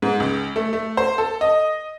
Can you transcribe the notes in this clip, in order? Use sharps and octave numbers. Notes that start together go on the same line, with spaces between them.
G#2
C#2
A3
A3
C5
A4
D#5